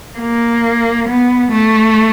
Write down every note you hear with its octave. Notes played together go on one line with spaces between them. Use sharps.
A#3
B3
A3